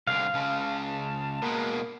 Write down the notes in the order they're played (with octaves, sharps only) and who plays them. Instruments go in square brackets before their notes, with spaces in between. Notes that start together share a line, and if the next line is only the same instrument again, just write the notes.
[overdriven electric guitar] C2 D3 [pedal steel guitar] F5 [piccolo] C7
[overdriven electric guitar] C#2 C#3 [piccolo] A5
[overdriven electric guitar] B2 G#3 [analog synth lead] A#3